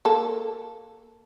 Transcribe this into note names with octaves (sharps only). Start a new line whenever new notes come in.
A#3 A4